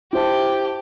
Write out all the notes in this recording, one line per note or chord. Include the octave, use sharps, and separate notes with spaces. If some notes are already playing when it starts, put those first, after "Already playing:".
E4 G4 C5 A5